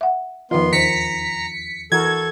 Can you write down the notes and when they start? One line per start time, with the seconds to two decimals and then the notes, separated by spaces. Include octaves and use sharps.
0.01 E5 F#5
0.51 E2 D#3 F3 B3 F4 C6
0.73 D#2 D#3 C5 A#5 B6 C#7
1.92 E3 F#4 A4 A#4 G#6